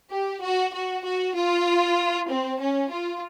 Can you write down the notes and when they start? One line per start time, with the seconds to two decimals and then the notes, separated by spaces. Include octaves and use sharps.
0.10 G4
0.42 F#4
0.73 F#4
1.04 F#4
1.34 F4
2.29 C4
2.59 C#4
2.90 F4